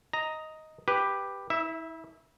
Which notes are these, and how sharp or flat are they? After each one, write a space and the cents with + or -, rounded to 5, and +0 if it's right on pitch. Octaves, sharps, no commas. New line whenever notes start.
D#5 +10 A#5 +0
G4 +5 B4 +0
E4 -35 E5 +0